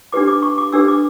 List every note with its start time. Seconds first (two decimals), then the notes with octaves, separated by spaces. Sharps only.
0.12 D4 G4 B4 D6
0.28 D6
0.42 C#6
0.58 D6
0.72 D4 G4 B4 E6
0.88 D6